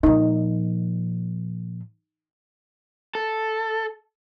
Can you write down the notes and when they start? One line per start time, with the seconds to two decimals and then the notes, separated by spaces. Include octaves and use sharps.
0.03 A#2 F3 D#4
3.15 A4